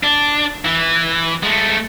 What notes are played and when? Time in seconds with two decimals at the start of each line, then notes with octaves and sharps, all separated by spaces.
0.03 D4
0.65 E3
1.43 G#3 A3